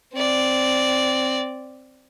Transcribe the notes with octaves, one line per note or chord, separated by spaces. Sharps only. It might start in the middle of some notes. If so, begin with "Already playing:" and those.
C4 D5